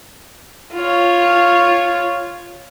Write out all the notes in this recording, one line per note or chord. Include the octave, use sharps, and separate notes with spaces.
F4 C#5